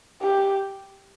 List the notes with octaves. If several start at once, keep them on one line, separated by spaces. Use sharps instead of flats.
G4